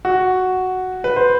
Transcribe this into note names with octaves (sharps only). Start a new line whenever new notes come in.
F#4
B4
C5